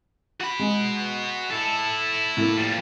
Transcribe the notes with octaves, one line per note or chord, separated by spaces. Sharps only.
F#4 B5
G#3
E4 A4
A2 A#3
F3 G3